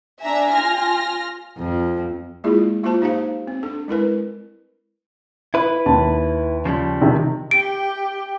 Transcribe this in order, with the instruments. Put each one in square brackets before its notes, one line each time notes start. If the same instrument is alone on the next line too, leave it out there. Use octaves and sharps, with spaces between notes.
[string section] D4 E5 A#5 [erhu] G#5
[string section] F4 F6 A#6
[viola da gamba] F2
[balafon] G#3 A#3 E4 F4 G#4
A#3 F4 F#4 C5 A5
D#4 G4 C5 F5
C4
D4 A4
G#3 E4 A#4 B4
[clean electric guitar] E4 B4
[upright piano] D#2 A5
[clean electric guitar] C#3 F3 G3
[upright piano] C3 D#3
[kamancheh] G4 G5 [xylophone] D7